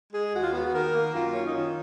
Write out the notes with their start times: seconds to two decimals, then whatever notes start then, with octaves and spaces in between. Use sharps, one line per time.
0.13 G#3 G#4
0.33 D#2 F#4
0.43 F4
0.53 B3 F#4
0.74 D#3 A#4
0.93 A#3
1.13 F#2 F4
1.33 C#4
1.46 D#4
1.53 D#3 F4